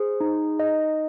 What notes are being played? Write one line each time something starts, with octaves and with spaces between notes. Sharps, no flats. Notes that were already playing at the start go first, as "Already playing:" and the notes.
Already playing: G#4 C5
D#4
D#5